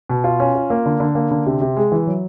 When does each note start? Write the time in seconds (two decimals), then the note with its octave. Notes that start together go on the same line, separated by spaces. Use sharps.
0.09 B2
0.24 F4
0.40 C#4
0.55 F4
0.70 A#3
0.86 D3
1.00 D3
1.15 A#3
1.31 D3
1.46 C3
1.61 C3
1.77 G#3
1.92 E3
2.07 F#3